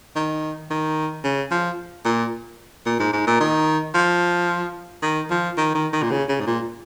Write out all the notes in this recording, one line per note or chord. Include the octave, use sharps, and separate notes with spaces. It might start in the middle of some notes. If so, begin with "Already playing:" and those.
D#3
D#3
C#3
F3
A#2
A#2
G#2
G#2
A#2
D#3
F3
D#3
F3
D#3
D#3
D#3
A#2
C#3
C#3
G#2
A#2